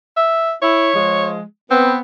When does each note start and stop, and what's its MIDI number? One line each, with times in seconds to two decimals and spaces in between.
0.17 0.53 76
0.62 0.90 64
0.62 1.28 73
0.94 1.41 53
0.94 1.41 56
1.71 2.00 59
1.71 1.96 60